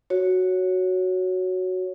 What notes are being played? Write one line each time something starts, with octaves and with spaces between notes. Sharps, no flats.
F#4 C#5